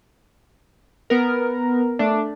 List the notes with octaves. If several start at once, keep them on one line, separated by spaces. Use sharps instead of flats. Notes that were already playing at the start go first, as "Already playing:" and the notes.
B3 A#4
A3 D4